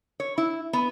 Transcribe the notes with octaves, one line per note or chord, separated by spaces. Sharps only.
C#5
E4
B3